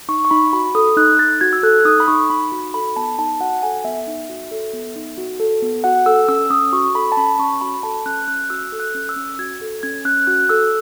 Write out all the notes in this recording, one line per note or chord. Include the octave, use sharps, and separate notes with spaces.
D#4 C#6
C#6
D#4 B5
F#4 B5
A4 D#6
D#4 F#6
D#4 A6
F#4 G#6
E6
A4 F#6
D#4 D#6
B5
D#4 C#6
D#4 B5
F#4
A4 B5
B3 A5
D#4 A5
F#4 F#5
A4 G#5
B3 E5
D#4
F#4
A4
B3
D#4
F#4
A4
B3
F#4 F#5
A4 E6
C#4 E6
C#4 D#6
F#4 C#6
A4 B5
A5
C#4 B5
C#4 C#6
F#4 B5
A4 A5
C#4 F#6
C#4 F#6
F#4 E6
A4
F#6
C#4
E6
C#4
F#4 G#6
A4
C#4 G#6
C#4 F#6
F#4 F#6
A4 E6